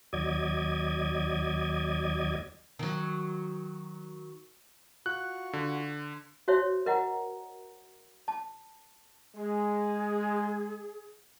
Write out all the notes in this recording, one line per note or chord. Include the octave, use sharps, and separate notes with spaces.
D#2 F#3 D5 D#5 G#6
D#3 F#3
F4 F#4 C#6 F#6
D3
F#4 C5 C#5 E5
A#4 D#5 F#5 A#5
A5
G#3 G#4